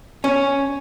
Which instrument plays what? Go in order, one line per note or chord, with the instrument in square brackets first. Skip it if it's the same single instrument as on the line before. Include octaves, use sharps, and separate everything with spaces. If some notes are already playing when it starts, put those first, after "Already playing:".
[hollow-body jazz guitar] C#4